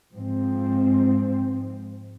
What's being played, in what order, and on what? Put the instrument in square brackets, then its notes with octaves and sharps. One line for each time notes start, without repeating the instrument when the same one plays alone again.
[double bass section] G#2 F3 C4